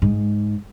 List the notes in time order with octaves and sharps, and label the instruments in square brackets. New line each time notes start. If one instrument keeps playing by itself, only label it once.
[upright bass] G#2